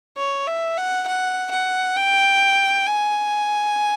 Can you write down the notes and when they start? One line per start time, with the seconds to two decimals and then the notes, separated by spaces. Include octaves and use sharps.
0.17 C#5
0.47 E5
0.77 F#5
1.07 F#5
1.51 F#5
1.97 G5
2.87 G#5